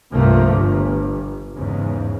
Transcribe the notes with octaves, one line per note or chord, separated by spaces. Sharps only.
C2 G2 F3 A3 A#3
G1
E2 G#2 C#3